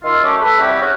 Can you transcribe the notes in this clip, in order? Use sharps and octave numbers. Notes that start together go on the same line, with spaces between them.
D#3 E4 F4
F#2 A3 C#4 D6
A4 B4
C3 G3 E4 F#4 G4
C#3 C#4 D#4 F#4